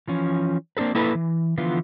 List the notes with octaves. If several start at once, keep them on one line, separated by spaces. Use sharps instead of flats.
E3 F3 C#4
A#3 C4 D4 A4 B4
A#3 E4 A4 B4
E3
D3 E3 F3 B3 F4